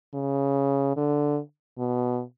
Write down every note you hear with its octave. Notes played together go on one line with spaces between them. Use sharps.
C#3
D3
B2